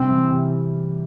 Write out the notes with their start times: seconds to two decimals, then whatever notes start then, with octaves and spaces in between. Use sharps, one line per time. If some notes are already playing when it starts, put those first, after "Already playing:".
Already playing: C3 G3 C4
0.10 E3
0.31 C3